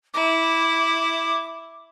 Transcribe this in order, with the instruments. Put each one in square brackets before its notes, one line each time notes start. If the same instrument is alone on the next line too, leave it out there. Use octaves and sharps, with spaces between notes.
[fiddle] E4 [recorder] D6